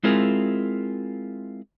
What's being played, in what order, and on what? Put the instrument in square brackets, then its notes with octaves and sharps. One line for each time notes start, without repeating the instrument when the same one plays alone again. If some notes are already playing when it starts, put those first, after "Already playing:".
[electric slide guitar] G#3 C4 E4 F4 G#4 A#4